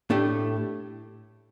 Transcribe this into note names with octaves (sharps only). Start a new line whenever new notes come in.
A2 A3 D4 G4